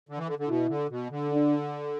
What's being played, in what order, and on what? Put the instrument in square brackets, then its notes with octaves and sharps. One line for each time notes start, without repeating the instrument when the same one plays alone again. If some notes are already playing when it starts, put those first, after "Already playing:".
[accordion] D3
E3
D3
D3
[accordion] B2 [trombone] E4
[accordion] D3
B2
D3
[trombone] D4